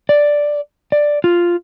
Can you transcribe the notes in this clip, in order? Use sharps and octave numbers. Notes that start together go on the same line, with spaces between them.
D5
D5
F4